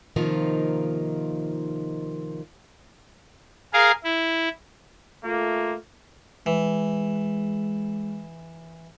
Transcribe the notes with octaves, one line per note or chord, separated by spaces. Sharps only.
C3 D#3 F3 A#3 D#4 F4
G#4 A#4 F5
E4
A3 A#3 F4
E3 G#3